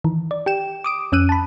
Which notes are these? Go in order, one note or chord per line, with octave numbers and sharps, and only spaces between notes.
D#3 E3
D5
G4 G5 E7
D6 D#6 D7
F2 C#4 E6 F#6 D#7
A5 B5